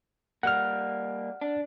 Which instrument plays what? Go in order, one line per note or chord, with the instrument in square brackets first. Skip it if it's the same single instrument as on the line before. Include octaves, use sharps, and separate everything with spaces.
[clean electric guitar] G3 A#3 [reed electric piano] F#5 F6
[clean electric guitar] D4